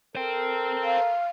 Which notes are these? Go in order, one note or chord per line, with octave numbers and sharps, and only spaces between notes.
A4 A#4 C5 G5
F5